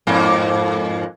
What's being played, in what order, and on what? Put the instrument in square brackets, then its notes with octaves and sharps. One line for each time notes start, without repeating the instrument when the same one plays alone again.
[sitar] F2 G#2 A#3